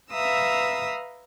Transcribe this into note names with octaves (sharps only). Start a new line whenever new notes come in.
B4 E5 F5 A#5 D#6 E6